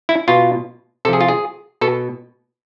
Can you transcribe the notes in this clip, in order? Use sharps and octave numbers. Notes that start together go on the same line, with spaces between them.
E4
B2 F4
C3 F3 G#4 A4
F4
G#4
B2 A4